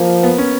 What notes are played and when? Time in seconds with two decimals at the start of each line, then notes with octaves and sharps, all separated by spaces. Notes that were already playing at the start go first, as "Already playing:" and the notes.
Already playing: F3 A#3
0.23 B3
0.38 C#4